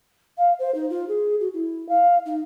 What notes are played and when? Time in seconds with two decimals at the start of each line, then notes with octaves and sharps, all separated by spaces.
0.38 F5
0.59 C5
0.75 D#4
0.90 F4
1.08 G#4
1.40 F#4
1.54 E4
1.89 F5
2.26 D#4